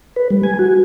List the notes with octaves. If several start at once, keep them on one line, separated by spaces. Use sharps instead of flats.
B4
G3
G#5
F#4